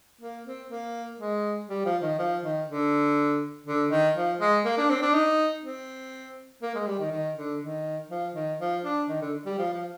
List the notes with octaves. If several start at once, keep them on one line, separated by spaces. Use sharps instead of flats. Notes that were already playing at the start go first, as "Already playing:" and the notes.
A#3
C4
A#3
G#3
G3
F3
D#3
F3
D#3
D3
D3
D#3
F3
G#3
A#3
D4
C4
D4
D#4
C4
A#3
G#3
G3
D#3
D#3
D3
D#3
F3
D#3
F3
D4
D#3
D3
G3
F3
F3